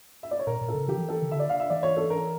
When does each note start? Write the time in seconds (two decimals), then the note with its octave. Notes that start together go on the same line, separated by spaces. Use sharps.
0.23 E5
0.31 D5
0.39 C#5
0.47 A#2 A#4
0.61 A#2
0.68 A4
0.75 C#3
0.88 E3 G4
0.96 F3
1.02 E3
1.09 A4
1.22 C#3
1.30 D3 E5
1.40 D5
1.49 F5
1.60 E5
1.70 E3 D5
1.83 C#5
1.97 A4
2.10 A#4